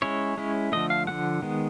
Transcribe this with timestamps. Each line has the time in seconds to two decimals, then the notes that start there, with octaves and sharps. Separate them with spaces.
0.02 G#3 C#4 E4 C#5
0.37 G#3 C#4 E4
0.72 D3 F3 A3 D#5
0.90 F5
1.07 D3 F3 A3 F#5
1.42 D#3 G#3 B3